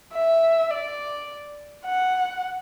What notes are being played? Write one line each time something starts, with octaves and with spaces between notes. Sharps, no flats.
E5
D5
F#5